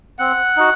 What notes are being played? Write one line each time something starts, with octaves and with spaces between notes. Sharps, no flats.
C4 F#5
D#4 F#4